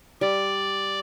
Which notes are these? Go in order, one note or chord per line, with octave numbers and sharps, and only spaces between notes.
G3 D5